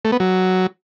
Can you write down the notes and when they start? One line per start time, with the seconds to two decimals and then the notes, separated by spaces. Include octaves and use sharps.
0.05 A3
0.12 B3
0.20 F#3